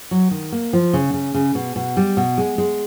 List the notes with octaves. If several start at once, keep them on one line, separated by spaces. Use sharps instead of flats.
F#3
D#3
A#3
F3
C#3
C#3
C#3
B2
B2
G3
B2
G#3
G#3